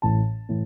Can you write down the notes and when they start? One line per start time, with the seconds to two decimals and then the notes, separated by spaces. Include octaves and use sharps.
0.02 A1 A2 E3 A5
0.49 A2 E3